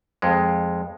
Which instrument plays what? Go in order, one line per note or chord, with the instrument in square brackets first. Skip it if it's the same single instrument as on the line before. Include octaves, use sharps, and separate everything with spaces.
[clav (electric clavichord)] F2 G#3